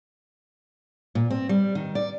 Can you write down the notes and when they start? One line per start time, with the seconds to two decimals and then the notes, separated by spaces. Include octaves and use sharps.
1.15 A#2
1.30 C4
1.49 G3
1.75 D#3
1.95 D5